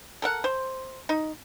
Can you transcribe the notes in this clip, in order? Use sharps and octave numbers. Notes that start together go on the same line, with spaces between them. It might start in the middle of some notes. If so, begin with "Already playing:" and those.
A4 A#4 F#5
C5
D#4